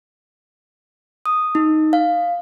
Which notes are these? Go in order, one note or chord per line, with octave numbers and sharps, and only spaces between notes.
D#6
D#4
F5